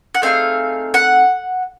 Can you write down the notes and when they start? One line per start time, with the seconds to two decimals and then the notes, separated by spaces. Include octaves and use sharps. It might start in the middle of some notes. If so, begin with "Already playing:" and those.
0.15 F#5
0.22 A3 C4 D#4 G#4 F5
0.94 F#5